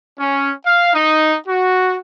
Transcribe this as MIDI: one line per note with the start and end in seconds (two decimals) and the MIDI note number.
0.18 0.52 61
0.65 0.92 77
0.94 1.36 63
1.47 1.96 66